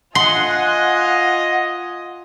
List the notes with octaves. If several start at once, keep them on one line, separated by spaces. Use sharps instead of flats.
F4 D#5 F#5 G#5 C6